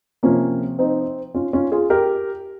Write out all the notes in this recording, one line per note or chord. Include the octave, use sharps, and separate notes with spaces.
C3 F3 A#3 C#4
C4 D#4
C#4 F4
C#4 F4
F4 G#4
G4 A#4